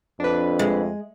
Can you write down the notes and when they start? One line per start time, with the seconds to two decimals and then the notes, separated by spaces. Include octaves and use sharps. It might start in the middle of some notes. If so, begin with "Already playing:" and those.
0.20 F2 D4 B4
0.59 G#3